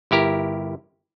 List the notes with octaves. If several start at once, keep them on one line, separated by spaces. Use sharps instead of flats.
G1 E4 G4 A#4